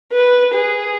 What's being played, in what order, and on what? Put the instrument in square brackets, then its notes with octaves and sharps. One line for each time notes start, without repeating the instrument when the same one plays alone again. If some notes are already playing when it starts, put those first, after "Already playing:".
[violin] B4
G#4